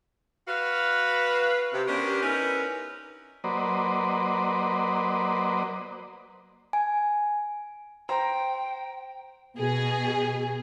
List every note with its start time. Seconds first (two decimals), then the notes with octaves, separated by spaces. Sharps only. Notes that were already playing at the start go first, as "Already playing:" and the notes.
0.48 F#4 B4 F5
1.73 C3
1.88 B3 C#4 D4 G4 A#4 C5
2.23 C#4 D#4 E4 A#4 B4
3.44 F#3 A#3 B4 C5 D5 D#5
6.73 G#5
8.09 C5 G5 A#5
9.58 B2 G#4